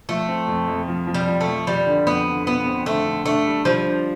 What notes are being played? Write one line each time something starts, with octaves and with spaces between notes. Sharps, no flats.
F3 A3
C4
F2
F2
F3
F3
G3
F3
A3
F3
F3 G3
D3
F2 B3
D3
F3 B3
C4
D3 A3
D3
A3 D4
G3
F3 G3
D4